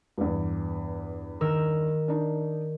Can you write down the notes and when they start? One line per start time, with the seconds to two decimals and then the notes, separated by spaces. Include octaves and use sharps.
0.18 E2 G2
1.41 D#3 A#4 E6
2.08 D4 D#4